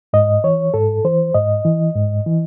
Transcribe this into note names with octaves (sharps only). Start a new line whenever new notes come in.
G#2 D#5
E3 C#5
G#2 A4
E3 C5
G#2 D#5
E3
G#2
E3